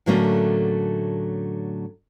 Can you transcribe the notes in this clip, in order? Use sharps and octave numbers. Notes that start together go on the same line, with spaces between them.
A2 D3 F#3 A3 A#3 C#4